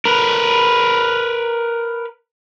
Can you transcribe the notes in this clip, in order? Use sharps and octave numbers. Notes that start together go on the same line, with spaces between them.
A#4 B4